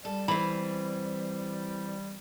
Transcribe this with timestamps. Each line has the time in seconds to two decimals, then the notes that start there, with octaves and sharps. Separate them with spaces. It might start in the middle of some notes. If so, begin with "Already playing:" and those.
0.05 G3 A4
0.28 E3 C4 B5